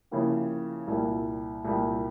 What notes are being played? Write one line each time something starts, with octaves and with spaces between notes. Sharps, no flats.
C#3 F3 A#3 E4 G4
C2 A#2 G3 A#3
C2 A#2 G3 A#3